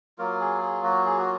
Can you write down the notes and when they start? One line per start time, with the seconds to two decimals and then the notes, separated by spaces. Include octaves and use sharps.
0.18 F#3 A#3 F4 A#4
0.40 G#4
0.61 G#4
0.83 F#4
1.05 G#4
1.18 F#4